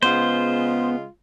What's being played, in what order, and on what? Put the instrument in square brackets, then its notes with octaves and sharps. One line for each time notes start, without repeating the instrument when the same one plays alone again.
[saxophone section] C#3 G#3 F4 [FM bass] B3 [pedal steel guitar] C5